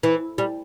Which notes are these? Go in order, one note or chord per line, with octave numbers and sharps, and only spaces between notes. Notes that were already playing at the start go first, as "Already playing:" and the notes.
E3
G3